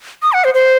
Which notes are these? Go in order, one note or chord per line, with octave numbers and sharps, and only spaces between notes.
D#6
F#5
C5
C5